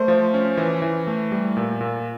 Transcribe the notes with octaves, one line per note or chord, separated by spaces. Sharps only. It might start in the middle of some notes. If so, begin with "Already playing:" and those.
Already playing: A3 C5
F3
C#4
E3
E3
A3
G3
A#2
A#2